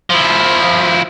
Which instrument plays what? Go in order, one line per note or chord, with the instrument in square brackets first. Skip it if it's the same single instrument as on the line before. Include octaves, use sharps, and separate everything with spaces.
[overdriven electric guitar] F3 E4